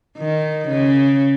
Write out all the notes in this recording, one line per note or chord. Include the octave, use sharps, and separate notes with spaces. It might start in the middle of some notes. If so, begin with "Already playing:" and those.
D#3
C#3